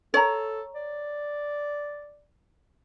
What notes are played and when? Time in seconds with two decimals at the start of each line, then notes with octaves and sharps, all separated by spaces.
0.14 A4 C#5 A#5
0.75 D5